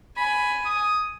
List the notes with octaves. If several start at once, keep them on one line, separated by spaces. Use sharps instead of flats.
G#5 B5
D#6